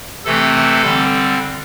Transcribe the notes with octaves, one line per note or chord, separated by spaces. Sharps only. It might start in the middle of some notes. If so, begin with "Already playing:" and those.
C3 E3 A3 C4 A4
D3 G3 C4